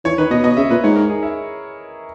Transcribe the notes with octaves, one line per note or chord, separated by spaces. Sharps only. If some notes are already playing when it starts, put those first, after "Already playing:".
E3 C#5
D#3 B4
B2 D#5
B2 D#5
C#3 E5
A#2 B4
G#2 C#5
A#4
G#4
E4